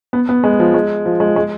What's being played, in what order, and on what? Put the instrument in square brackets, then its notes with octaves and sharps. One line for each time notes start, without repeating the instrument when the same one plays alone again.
[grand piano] B3
B3
G#3
F3
G#3
F3
G#3
G#3